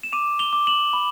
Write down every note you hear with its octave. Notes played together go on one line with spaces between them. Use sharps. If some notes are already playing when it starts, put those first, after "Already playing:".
E7
D6 D#7 F7
F7 G7
D6
E7 F#7
B5